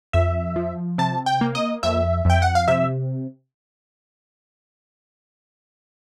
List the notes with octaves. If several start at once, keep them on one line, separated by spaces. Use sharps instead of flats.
F2 E5
F3
C3 A5
G5
A#3
D#5
F2 E5
F2 G5
F#5
F5
C3 E5